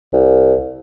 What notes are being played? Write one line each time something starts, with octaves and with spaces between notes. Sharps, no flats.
C2